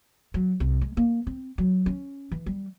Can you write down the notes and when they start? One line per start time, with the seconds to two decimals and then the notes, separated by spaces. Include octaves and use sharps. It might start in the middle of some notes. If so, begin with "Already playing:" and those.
0.34 F#3
0.60 C2
0.81 G#3
0.97 A#3
1.27 C4
1.58 F#3
1.86 C#4
2.31 E3
2.46 G3